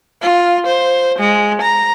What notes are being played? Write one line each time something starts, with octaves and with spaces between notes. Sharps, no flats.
F4
C5
G#3
A#5